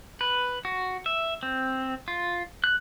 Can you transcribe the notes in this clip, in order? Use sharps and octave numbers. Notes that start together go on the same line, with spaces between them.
B4
F#4
E5
C4
F4
F#6